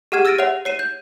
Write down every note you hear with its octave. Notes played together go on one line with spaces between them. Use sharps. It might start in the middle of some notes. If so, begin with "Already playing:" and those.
G4 G#4 F#5 F6 G#6 D#7
E6 F6 A6 A#6 D7 D#7
C#5 E5 F#5 F7
C#5 C7 D#7 E7
G6